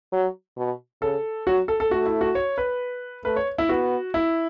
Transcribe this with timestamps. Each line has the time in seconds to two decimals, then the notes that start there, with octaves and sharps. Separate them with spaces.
0.12 F#3
0.57 B2
1.02 C#3 A4
1.47 F#3 F#4
1.68 A4
1.80 A4
1.91 A3 F#4
2.06 E4
2.21 F#4
2.35 C#5
2.58 B4
3.25 A3 B4
3.36 C#5
3.58 E4
3.69 B3 F#4
4.14 E4